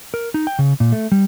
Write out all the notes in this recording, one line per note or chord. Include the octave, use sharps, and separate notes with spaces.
A#4
D#4
G5
C#3
A#2
A3
G3